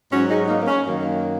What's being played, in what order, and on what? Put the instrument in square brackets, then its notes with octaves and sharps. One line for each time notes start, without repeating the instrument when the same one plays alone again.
[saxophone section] G#2 F#3 C#4 F#4
D#4 G#4
F#4
A#3 D#4
A#3
C#4
F#2 D#3 F#3 A#3
A#3